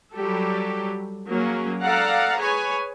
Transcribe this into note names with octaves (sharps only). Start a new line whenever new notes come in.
F#3 G3 G4 A4
F#3 A#3 C#4 G#4
A4 D5 F5 F#5 A#5
G#4 B4 C#5 G#5